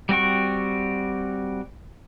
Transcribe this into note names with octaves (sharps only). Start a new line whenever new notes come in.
G3 C4 F#4 G5 C#6